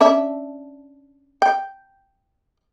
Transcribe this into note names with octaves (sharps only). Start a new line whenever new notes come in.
C#4 D4 E5
G5